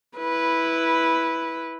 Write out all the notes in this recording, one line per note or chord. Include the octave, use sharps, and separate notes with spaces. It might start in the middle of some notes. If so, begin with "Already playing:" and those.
E4 B4